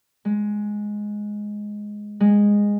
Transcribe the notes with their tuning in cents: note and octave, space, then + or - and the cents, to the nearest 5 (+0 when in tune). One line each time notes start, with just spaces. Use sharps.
G#3 +5
G#3 -15